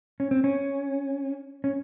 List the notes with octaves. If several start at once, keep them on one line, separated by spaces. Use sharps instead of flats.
C#4
C4
C#4
C#4